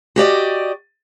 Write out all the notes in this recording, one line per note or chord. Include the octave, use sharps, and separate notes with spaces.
F#4 G4 D5 D#5